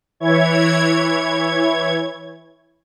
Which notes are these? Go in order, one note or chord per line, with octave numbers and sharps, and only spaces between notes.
E3 E4 C#5 G#6